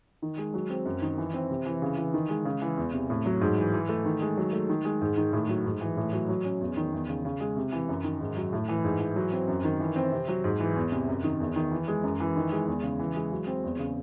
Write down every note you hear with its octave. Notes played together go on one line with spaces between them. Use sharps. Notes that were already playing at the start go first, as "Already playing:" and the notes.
D#3
G#3
F#3
C4
F#2
D#3
E3
C4
C3
E3
C#3
E3
D#3
G#3
C#3
E3
E2
C3
A2
F#3
G#2
E3
E3
A3
D#3
G#3
F#3
A3
D#3
G#3
G#2
D#3
A2
F#3
G#2
E3
A2
F#3
F#3
C#4
E2
D#3
E2
C#3
C#3
G#3
C3
E3
F#2
D#3
G#2
F#3
A2
E3
G#2
E3
F#3
C4
F#2
D#3
E3
C4
C3
F#3
G#2
E3
E2
C3
F#2
D#3
E2
D#3
E3
G#3
F#2
E3
D#3
G#3
E2
C#3
E3
G#3
F#3
C4
E2
C#3